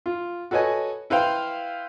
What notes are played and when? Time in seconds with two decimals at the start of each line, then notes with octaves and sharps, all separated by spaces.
0.06 F4
0.51 F#4 A4 B4 C#5 D#5 G#5
1.10 E4 B4 C5 F5 G5